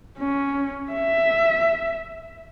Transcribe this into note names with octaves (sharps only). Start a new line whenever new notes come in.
C#4
E5